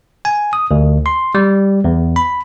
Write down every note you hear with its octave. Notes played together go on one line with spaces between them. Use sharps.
G#5
D#6
D2
C6
G3
E2
B5